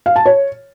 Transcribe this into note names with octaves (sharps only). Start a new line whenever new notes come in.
F5
A5
C#5